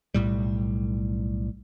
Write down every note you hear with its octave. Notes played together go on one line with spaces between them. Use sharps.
B1 A2 G3